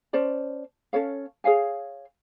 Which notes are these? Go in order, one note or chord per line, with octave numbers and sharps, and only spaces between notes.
C#4 C5 D5 A5
C#4 A4 C#5 F5
G#4 C#5 F5 G#5